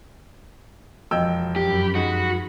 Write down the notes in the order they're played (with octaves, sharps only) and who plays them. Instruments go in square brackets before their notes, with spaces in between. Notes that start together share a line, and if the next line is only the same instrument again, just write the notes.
[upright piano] E1 G5 E6 [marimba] F2 F3 D#5
[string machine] F#2 B5 [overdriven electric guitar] G4
[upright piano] G#3 D#4 [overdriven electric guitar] F#4